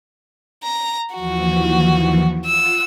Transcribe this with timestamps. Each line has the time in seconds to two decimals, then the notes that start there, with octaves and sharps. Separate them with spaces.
0.64 A#5
1.14 D#2 E3 F3 F#4
2.46 F4 F#5 E6